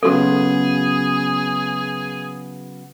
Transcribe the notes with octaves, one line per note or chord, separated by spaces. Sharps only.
C#3 F#3 B3 F#4 G#4 A4